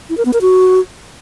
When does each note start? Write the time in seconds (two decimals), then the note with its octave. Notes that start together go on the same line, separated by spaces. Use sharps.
0.09 E4
0.17 A#4
0.25 B3
0.33 A#4
0.41 F#4